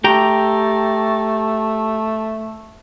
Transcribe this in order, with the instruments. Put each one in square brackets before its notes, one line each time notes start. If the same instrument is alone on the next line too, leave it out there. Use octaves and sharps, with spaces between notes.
[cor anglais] A3 [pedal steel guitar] G4 G5 A#5